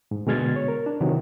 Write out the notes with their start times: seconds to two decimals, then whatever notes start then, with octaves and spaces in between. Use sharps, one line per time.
0.11 G#2
0.27 B2 D3 G#3 F6 G#6 A6
0.56 C#5
0.68 A#4
0.86 D4
1.01 C3 D#3 E3 F#3